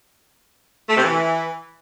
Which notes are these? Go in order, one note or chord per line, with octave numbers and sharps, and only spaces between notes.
A3
C3
E3